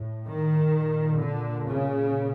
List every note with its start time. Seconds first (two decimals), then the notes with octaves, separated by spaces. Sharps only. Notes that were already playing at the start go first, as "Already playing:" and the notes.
Already playing: A2
0.27 D#3
0.74 A#2
1.19 D3
1.65 C#3